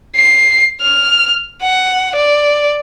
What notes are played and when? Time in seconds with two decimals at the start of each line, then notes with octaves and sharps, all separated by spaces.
0.16 C7
0.81 F6
1.62 F#5
2.16 D5